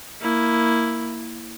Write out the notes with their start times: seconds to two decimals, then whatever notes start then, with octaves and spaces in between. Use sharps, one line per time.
0.21 A#3 E4